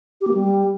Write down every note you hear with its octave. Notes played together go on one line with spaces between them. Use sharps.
G4
A#3
G3